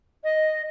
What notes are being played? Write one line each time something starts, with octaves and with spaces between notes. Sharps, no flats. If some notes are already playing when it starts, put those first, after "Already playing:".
D#5